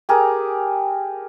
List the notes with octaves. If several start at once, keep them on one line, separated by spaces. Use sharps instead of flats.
G4 G#4 A#4